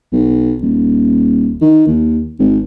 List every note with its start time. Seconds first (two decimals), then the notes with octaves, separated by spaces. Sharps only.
0.12 B1
0.62 D#1
1.61 D#3
1.87 D#2
2.39 G#1